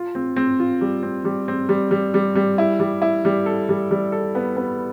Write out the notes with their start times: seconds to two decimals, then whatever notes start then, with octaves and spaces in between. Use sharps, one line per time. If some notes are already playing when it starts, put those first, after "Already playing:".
Already playing: F4
0.15 C4
0.36 C4
0.60 F4
0.81 G3
1.03 C4
1.25 G3
1.48 C4
1.69 G3
1.91 G3
2.14 G3
2.35 G3
2.58 E4
2.80 G3
3.02 E4
3.25 G3
3.46 A4
3.69 G3
3.91 G3
4.12 A4
4.35 B3
4.56 B3